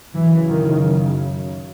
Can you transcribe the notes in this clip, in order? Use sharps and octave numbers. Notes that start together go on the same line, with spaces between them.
F#2 C#3 E3
D#3